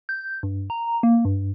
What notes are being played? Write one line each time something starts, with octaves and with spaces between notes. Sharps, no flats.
G6
G2
A#5
A#3
G2